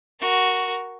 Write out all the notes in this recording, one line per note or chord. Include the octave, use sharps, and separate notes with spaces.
F#4 A#4